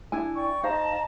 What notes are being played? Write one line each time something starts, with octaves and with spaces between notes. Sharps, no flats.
D4 E4 G#5
D5 G5 C#6
D#4 C5 D#5 F5 A5 A#5